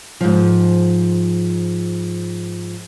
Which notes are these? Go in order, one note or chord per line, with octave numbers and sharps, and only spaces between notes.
G#2 F3